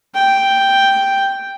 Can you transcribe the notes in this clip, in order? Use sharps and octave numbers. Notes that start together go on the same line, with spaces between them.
G5